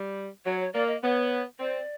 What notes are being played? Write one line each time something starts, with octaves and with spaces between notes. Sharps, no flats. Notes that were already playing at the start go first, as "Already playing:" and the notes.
Already playing: G3
F#3 C#5
C#5
A#3 D5
D#5
B3 C#5
C4 D5